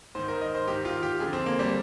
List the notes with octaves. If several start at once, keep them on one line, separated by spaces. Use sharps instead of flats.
G#2 D#3 C5
A#4
D#5
C5
G#2 D#3 G4
F4
G4
F2 D3 G#4
C4
A#3
G3